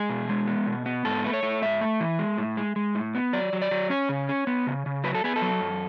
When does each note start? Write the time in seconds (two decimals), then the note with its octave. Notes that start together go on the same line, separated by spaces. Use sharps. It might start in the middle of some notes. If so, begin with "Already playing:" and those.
Already playing: G#3 G#4
0.10 B2
0.29 G#3
0.47 B3
0.67 B2
0.86 B3
1.05 G#2 A4
1.24 A3 B4
1.34 C#5
1.43 A3
1.62 G#2 E5
1.81 A3
2.00 E3
2.19 G#3
2.38 A2
2.57 G#3
2.76 G#3
2.95 A2
3.15 B3
3.33 F#3 D5
3.53 F#3
3.62 D5
3.71 F#3
3.90 C#4 C#5
4.09 C#3
4.29 C#4
4.47 B3
4.67 C#3
4.86 C#3
5.04 F#3 B4
5.15 A4
5.24 B3 G#4
5.36 A4
5.42 F#3
5.61 F#2